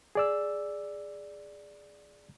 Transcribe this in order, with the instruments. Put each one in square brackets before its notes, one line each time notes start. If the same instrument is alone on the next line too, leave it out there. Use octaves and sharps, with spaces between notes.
[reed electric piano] G#4 D5 E6